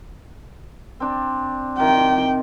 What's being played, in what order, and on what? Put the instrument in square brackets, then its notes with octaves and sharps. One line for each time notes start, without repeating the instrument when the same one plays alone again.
[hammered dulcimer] C4 D4
[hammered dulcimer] C3 D#3 [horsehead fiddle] G5